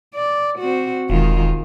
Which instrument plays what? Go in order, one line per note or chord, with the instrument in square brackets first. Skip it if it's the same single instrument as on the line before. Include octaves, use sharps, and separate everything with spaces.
[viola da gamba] D5
C4 F#4
[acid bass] E1 [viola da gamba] D#3 G#3 F4